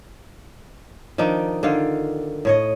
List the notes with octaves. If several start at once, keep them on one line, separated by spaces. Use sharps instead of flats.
D#3 F3 D4 D#4
D3 D#3 F4 F5
A2 C#5 D#5